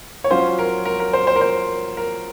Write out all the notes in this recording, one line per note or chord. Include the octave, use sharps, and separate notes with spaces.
C#5
F#3 C#4 F4 C5
A#4
A#4
A#4
C5
C5
A#4
C5
A#4